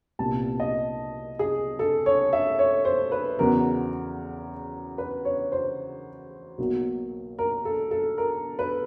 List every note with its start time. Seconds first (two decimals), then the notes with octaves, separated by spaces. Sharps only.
0.19 C2 A#2 G3 B3 A5
0.60 D#5
1.39 G#4
1.79 A4
2.06 C#5
2.33 E5
2.59 C#5
2.85 C5
3.12 B4
3.39 E2 C#3 F#3 B3 A#4
4.98 B4
5.25 C#5
5.52 C5
6.58 B1 B2 F#3 A#3
7.39 A#4
7.65 A4
7.91 A4
8.18 A#4
8.59 B4